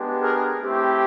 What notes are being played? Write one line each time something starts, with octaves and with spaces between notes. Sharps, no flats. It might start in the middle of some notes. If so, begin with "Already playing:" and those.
Already playing: G#3 B3 D4 G4
G#4 A#4
A3 C4 E4 G4